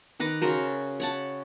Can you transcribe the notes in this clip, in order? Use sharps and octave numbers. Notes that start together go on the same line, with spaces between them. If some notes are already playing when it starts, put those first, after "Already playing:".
D#3 B4 A#5 D6
C#3 F#4 A#4 C5
C#5 F#5 A5